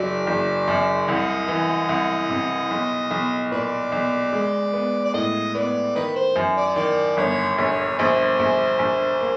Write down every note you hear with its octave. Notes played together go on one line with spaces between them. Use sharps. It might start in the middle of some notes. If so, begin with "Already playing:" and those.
Already playing: F#1 F#3 D5
F#1
F#2
C2 D#5
E3
C2
C3
B1
B1
A#2 B4 D5
B1
G#3
B3
D5
A2 D#5
B3 D5
D#3 D#4 B4
C5
F#2
D5
D#3 D5
G1 C#5
A#1 C#5
A#1 D#4 C5
A#1
A#1
A#3